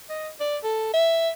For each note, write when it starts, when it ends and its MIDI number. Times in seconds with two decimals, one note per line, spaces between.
0.10 0.30 75
0.40 0.57 74
0.64 0.89 69
0.94 1.30 76